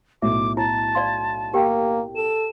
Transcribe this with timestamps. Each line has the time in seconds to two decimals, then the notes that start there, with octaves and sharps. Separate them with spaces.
0.22 B1 A2 E5 D6
0.57 E4 A5
0.95 D5 F5 C6
1.54 A#3 G4 A#4 G5
2.16 A4 E7